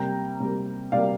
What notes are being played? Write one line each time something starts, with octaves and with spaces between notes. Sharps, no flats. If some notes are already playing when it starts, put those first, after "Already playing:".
Already playing: C3 G3 A#3 G5 A#5
C3 G3 A#3
C3 G3 A#3 D5 F5